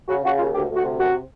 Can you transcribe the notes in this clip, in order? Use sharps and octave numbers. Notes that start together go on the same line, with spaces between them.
C#3 F#4
C#3 F#4
D#2 F4
D2 G4
D2
F#4
C3
F#2 F#4